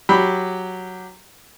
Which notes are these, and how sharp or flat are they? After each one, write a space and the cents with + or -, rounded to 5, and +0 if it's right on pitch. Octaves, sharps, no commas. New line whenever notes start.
F#3 +0 G4 +0 B5 +0